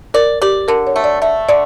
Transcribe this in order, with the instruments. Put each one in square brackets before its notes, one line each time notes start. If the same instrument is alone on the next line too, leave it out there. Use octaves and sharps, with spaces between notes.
[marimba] A#4 [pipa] D5
[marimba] G4 [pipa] D5
[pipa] D3 [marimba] A#4
[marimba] C#5
[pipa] A3
[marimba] D5
[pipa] A3 [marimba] E5
[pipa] D3 [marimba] D5